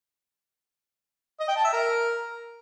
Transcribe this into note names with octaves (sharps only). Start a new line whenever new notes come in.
D#5
G5
A5
E5
A#4